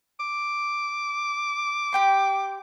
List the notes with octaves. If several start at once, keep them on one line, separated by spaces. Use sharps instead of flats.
D6
G4 G5 C6